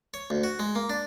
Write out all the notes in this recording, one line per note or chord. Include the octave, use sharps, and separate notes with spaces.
C#5
D2
F#4
G#3
A#3
D4